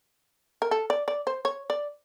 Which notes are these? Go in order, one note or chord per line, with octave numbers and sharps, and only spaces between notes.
A#4
A4
D5
D5
C5
C#5
D5